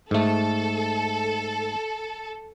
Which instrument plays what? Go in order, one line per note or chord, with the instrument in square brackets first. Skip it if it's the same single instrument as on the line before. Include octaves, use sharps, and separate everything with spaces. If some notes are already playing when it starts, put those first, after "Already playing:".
[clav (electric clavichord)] G#2 A3 [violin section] A4